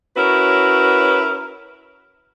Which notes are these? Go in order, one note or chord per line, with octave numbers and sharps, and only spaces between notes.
C#4 E4 F#4 A#4 B4 C#5